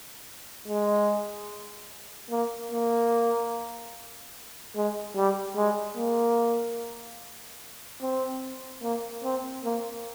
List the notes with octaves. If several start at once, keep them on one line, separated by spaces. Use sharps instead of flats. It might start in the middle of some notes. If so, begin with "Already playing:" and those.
G#3
A#3
A#3
G#3
G3
G#3
A#3
C4
A#3
C4
A#3